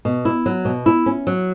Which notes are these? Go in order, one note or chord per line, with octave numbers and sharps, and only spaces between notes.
B2
E4
F#3
B2
E4
C#4
F#3